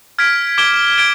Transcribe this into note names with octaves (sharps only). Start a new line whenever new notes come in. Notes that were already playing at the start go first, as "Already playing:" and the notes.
F6 G#6 B6 D7
D6 G#6 D7 G7
G#6 D7 G7